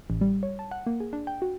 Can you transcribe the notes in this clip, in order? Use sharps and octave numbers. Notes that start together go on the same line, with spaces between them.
A1
G3
C#5
A5
F#5
A#3
G#4
D4
G5
F#4